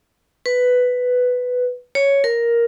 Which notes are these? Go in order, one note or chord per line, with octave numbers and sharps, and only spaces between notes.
B4
C#5
A#4